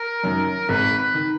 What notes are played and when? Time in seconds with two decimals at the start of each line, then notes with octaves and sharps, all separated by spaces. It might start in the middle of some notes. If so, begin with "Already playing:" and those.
Already playing: A#4
0.23 F#2 D#3
0.69 G#1 B4
0.98 B4
1.14 D#3